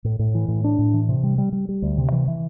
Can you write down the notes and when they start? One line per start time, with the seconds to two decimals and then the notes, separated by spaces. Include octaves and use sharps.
0.05 A2
0.19 A2
0.35 E3
0.48 A2
0.64 D4
0.79 A2
0.94 E3
1.09 C3
1.23 G3
1.38 G3
1.53 G3
1.69 G3
1.82 D2
1.98 C3
2.12 E3
2.28 E3